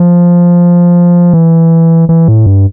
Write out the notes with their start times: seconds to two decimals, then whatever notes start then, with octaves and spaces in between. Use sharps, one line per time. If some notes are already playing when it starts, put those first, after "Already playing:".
Already playing: F3
1.33 E3
2.09 E3
2.28 A2
2.46 G2